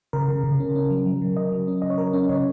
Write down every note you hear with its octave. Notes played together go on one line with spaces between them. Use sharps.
C#3 A#4
C#3
C#3
C#4
C#4
F#3
F#3
C#3
C#3 D#5
F#3
C#4
C#3 D#5
C#5
F#3 A#4
C#4
C#3 C#5